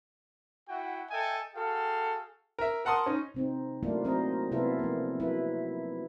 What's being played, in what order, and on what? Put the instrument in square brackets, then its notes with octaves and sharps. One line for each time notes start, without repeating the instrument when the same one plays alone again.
[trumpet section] E4 F#4 F#5 G5
A4 D#5 E5 G5 G#5
F#4 G#4 A4 F5 G5
[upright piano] A#4 E5
A#4 F#5 A5 C6 D#6
C#4 D#4
[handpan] C3 C4 D#4
F#3 A3 A#3 D4 E4 F4
F#3 C4 D4 A#4 C5 D#5
C3 B3 E4 F4 G#4 A4
F3 A#3
F#3 E4 B4